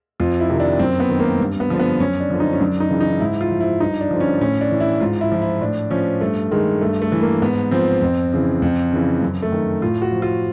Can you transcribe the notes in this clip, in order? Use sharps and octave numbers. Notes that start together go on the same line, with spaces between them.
F2 F4
E4
C3 D#3
D4
F#2 C4
B3
D#3
A#3
G2
B3
D3 F3
B3
F#2 C#4
D4
D3 F3
D#4
C#4
F#2 D4
D#4
C#3 E3
D#4
G#2 E4
F4
F3
E4
G2 D#4
D4
D3 F3
C#4
A2 C#4
D4
E3
E4
G#2 F4
E4
F3
E4
A2 D4
F3 C#4
G2 A3
D#3 G#3
G2 A3
A3
E3
A#3
G#2 B3
F3 C4
F2
C#3 E3
F2
C#3 E3
F#2
A3
D#3
A2 F4
F#4
F3
F4